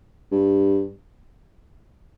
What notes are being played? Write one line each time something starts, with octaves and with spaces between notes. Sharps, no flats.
G2